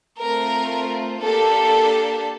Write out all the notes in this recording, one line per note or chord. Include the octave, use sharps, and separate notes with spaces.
A3 C4 F4 A#4
A#3 D4 G4 A4